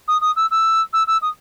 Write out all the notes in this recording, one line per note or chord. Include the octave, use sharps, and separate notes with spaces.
D#6
D#6
E6
E6
E6
E6
D#6